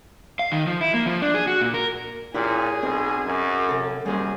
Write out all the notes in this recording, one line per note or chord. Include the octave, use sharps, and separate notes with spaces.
F5
D#3
F3
E4
A#3
F3
D4
G#4
F#4
A#2
A#4
A#2 E4 G4 G#4 C#5
B1 C4
F#2
C3 A4
F#2 G3 A#3 G#4 C5